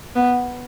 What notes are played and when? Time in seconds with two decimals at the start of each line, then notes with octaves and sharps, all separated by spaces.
0.15 B3